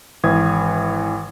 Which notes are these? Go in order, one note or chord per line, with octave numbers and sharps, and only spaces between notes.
G#1 E3 D#6 G#6